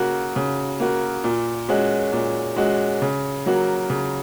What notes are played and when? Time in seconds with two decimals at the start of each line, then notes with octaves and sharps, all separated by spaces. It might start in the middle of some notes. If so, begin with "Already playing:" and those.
Already playing: C#3 A#3 F#4
0.36 C#3
0.80 A#3 F#4
1.24 A#2
1.69 G#3 C#4 F#4
2.13 A#2
2.56 G#3 C#4 F#4
3.02 C#3
3.46 F#3 A#3 F#4
3.90 C#3